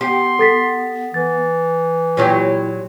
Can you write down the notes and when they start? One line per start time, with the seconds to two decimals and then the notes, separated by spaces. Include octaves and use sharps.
0.01 B3 G4 C6
0.39 A4 A6 B6
1.14 E3 A6
2.17 A#2 F#3 E4 G4